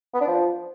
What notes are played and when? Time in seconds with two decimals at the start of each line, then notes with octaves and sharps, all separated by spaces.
0.14 B3
0.21 D4
0.28 F3